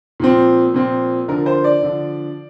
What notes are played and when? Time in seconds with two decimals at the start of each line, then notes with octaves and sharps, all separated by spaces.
0.20 A#2 F3 C4
0.74 A#2 F3 C4
1.28 D3 F3 D4 A#4
1.46 C5
1.64 D5
1.82 D3 F3 D4